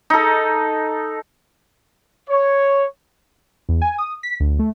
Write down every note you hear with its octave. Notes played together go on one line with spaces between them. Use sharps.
D#4 A4
C#5
E2
G#5
D#6
B6
D2
A3